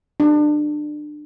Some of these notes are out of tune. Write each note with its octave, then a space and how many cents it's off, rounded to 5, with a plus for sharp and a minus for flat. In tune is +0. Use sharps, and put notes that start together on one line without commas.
D4 +25